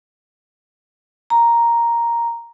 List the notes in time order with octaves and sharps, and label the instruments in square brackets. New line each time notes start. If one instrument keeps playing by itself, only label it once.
[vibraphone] A#5